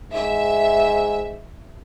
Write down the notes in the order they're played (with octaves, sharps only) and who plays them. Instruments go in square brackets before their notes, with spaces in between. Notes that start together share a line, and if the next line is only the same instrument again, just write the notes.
[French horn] G#2 [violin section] E5